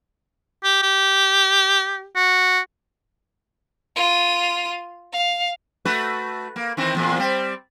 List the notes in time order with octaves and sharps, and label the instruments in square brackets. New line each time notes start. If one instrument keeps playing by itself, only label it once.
[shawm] G4
G4
F#4
[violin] F4 D#7
F5
[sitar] A3 F#4 B4
A#3
D#3 E3 C4
E2 A#2
G3 C4